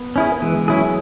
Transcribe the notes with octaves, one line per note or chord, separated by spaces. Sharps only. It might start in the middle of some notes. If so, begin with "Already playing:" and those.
Already playing: B3
C#4 E4 G#4
B3
E3 G#3
E3
F#3 C#4 E4 G#4
G#3